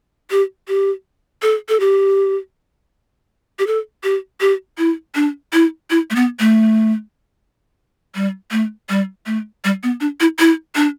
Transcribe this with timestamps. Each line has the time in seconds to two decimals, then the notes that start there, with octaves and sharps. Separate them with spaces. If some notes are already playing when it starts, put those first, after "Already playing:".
0.31 G4
0.68 G4
1.42 A4
1.69 A4
1.80 G4
3.59 G4
3.67 A4
4.04 G4
4.41 G4
4.78 E4
5.15 D4
5.53 E4
5.90 E4
6.10 A3
6.16 B3
6.40 A3
8.15 G3
8.51 A3
8.89 G3
9.26 A3
9.64 G3
9.83 B3
10.01 D4
10.21 E4
10.39 E4
10.75 D4